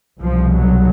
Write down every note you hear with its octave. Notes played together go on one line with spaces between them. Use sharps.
C2 B2 F3
F#3